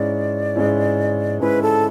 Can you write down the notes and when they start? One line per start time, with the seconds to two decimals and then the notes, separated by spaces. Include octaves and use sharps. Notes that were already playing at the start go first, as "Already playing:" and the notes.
Already playing: G#2 G#3 C#4 E4 D5
0.56 G#2 G#3 C#4 E4
1.40 G#2 G#3 C#4 E4 B4
1.63 A4